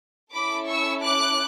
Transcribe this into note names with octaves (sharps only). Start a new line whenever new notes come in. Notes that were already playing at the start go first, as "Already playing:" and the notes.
C#4 E4 A4 B5 D6
C#6 E6
D6 F#6